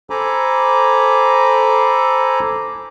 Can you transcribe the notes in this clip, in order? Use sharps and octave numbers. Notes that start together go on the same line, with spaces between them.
A4 C5 G#5 A#5 B5 D6